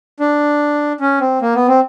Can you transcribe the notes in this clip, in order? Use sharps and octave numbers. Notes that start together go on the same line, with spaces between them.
D4
C#4
C4
A#3
B3
C4